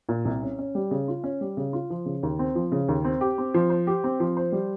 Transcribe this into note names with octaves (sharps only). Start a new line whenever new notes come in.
A#2
C2
C#4
C#4
G3
C#3
F4
C#4
G3
C#3
F4
F3
C#3
D#2
C4
F3
C#3
D#2
C4
G4
C4
F3
C5
G4
C4
F3
C5
G3